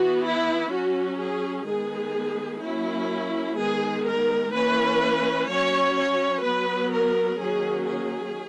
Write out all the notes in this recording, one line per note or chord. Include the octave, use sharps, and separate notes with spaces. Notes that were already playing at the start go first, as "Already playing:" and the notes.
Already playing: E3 B3 F#4
E4
F#3 C#4 F#4
G#4
D#3 G#3 B3 G#4
F#3 A#3 C#4 E4
D#3 G#3 B3 G#4
A#4
E3 A#3 C#4 B4
F#3 C#4 C#5
C#5
F#3 B3 B4
A#4
D#3 F#3 A#3 C#4 G#4
G#4